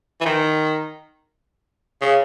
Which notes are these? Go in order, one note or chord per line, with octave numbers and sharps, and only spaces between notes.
E3
D#3
C#3